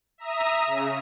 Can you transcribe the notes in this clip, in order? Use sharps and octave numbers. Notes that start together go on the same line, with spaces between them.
E5 A#5 D#6
C#3